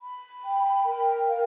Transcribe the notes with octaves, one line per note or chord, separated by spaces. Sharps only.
B5
G5
A#4
F5